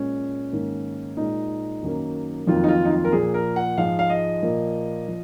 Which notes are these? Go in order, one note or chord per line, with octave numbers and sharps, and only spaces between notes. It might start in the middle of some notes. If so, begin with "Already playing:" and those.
Already playing: A#2 G#3 C#4
G#2 D#3 A#3
A#2 G#3 D#4
F#2 D#3 F#3 A#3
F2 D#3 F#3 A#3 F4
D#4
F4
D#4
F4
A#4
A#2 F3 A#3 G#4
A#4
F#5
G#2 F3 G#3 F5
F5
D#5
A#2 F3 A#3
F3